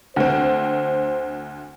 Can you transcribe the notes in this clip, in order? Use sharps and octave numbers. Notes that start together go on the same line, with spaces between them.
D2 C4 C5